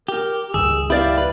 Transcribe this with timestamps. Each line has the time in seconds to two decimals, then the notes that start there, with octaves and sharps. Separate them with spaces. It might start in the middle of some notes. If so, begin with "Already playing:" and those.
0.08 G4 A#4
0.54 C#2 G2 D#3 G#4 E6
0.90 E4 G4 D5 F5
1.18 B4